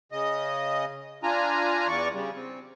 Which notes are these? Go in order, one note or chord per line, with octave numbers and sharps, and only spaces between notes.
C#3 D#5
D4 F4 G#5 A#5
E2 E3 D5 C#6
C#3 G3
C4